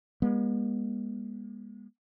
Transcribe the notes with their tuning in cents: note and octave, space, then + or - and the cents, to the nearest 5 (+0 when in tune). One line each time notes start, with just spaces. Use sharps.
G#3 -30 B3 -45